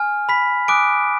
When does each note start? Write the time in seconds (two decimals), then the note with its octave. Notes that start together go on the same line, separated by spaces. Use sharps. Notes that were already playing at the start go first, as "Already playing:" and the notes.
Already playing: G#5 F6
0.29 B5 B6
0.68 G#5 D6 D#6 F#6 D7